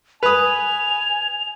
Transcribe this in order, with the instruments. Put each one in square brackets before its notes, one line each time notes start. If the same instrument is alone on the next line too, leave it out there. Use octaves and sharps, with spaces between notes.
[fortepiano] B4 D#6 [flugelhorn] G#5 [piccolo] F7